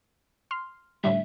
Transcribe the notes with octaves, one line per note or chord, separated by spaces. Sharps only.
C6 F6
A2 D3 G3 E5